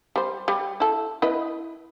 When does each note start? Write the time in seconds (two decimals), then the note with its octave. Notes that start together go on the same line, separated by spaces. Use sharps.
0.16 G3 C5
0.48 G3
0.80 E4 A4
1.22 E4 B4 D#5